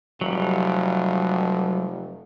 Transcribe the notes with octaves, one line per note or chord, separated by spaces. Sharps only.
F1 F#3 G3